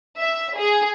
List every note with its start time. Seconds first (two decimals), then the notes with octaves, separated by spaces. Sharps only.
0.18 E5
0.57 G#4